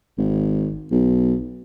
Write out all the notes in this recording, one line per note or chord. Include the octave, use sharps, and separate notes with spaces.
G#1
B1